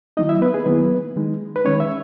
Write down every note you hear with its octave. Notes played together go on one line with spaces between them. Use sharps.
D#3 F#3 A#3 D#4 E4 D#5
E4 E5
B3 B4
G#4
D#3 F#3 A#3 B3 E4 B4
D#3 G#3 D#4
B4
D#3 G#3 C#4 D#4 C#5
E5